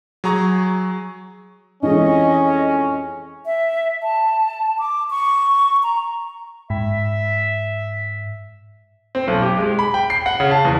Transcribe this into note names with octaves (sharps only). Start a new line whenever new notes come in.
F#3 G#4 A#5 C#6
F2 E3 G#3 C#4 D#5
E5
A5
D6
C#6
A#5
G#2 E5
C4
B1
G4
G#3
B5
G5
C7
F#5
C#3
A5
E2